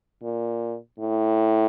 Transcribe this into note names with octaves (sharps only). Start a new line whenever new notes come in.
A#2
A2